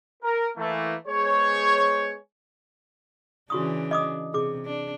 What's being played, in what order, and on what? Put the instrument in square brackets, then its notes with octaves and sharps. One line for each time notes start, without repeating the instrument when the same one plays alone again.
[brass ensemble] A#4
E3 A3 A#3
G#3 B3 G#4 C5 C#5
[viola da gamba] C#3 E3 D4 [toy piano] F#4 C#6 D#6
[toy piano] D#5 D6 D#6
[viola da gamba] C3 [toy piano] G#4 D6
[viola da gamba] D4